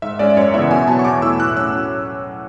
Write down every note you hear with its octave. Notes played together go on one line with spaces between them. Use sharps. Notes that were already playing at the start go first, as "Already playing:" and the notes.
G#2 E5
G#3 C#4 D5
D5
F#2 C#5
C#3 E3 B3 E4 E5
B2 G#5
F#3 B3 A5
C#6
E2 D6
B2 A3 E4 E6
A2 F#6
F#3 C#4 E6